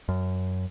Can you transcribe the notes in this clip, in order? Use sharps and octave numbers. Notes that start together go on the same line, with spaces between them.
F#2